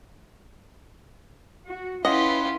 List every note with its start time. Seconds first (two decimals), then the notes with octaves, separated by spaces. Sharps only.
1.66 F#4
2.05 C#4 E4 F4 G4 B4 D#5 F#5